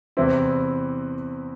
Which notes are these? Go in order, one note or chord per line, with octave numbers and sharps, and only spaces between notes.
E2 C3 E3 C4 E4